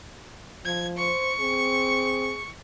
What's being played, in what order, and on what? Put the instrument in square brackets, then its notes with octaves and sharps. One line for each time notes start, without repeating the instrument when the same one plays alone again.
[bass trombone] F3 [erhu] G#6
[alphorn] C5 [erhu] C#6
[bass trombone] C4 [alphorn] G#4